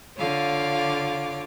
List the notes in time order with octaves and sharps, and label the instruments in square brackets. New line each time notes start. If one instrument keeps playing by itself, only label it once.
[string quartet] D3 F4 C#5 F5 D6